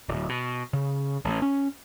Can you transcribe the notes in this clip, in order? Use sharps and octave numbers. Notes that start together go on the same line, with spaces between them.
D1
B2
C#3
A1
C#4